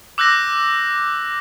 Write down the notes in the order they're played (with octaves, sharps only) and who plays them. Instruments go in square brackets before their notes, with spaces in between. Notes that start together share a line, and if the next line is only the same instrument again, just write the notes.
[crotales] D6 E6 F#6 G6 A#6